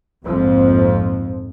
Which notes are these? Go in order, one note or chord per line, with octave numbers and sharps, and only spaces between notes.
A#1 F2 G#2 F3